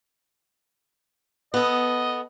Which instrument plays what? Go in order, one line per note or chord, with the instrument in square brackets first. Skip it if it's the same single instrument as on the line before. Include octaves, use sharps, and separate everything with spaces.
[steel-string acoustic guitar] B3 A4 [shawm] D#5